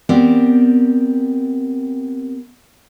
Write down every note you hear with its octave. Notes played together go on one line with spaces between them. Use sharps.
B3 C4 G4 A#4 D5